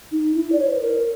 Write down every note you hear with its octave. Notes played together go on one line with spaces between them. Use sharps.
D#4
E4
D5
C#5
C5
B4
A#4